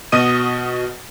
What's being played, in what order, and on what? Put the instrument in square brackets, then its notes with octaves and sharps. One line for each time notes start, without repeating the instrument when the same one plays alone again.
[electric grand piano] B2 F#4 D#5 D#6 D#7